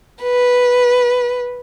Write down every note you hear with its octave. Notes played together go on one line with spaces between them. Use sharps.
B4